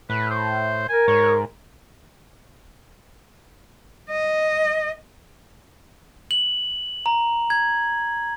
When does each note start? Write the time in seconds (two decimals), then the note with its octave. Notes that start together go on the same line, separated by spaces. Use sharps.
0.10 A2 B4
0.31 C5
0.89 A#4 G#5
1.08 G#2 C#5
4.10 D#5
6.31 F#7
7.06 A#5
7.50 G#6